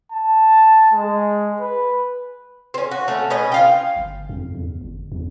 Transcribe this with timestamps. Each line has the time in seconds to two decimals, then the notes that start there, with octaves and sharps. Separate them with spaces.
0.12 A5
0.93 G#3
1.60 B4
2.74 C4 C#4
2.91 F#4
3.08 A3 C#4 F#4
3.30 B2 C#4 D#5
3.52 F4 F5 G5
3.96 G1
4.29 F2
4.55 E2
4.81 G1
5.12 E2